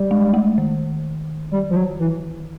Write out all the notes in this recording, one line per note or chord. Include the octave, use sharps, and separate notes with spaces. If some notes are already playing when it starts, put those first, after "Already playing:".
Already playing: G3
G#3
A3
D#3
G3
F3
F#3
E3